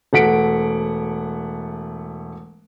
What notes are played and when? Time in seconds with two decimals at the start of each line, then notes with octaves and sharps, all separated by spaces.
0.13 E1 A3 F#5 B6 D7